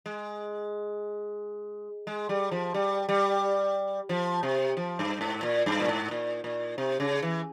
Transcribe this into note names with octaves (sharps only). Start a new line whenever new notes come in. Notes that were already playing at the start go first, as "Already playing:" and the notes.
G#3
G#3
G3
F3
G3
G3
F3
C3
F3
G2
G#2
A#2
G2
A#2
G#2
A#2
A#2
C3
C#3
E3